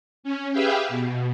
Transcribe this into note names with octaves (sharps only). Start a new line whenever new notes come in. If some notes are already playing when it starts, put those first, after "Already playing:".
C#4
G4 G#4 B4 E5 F5 G5
B2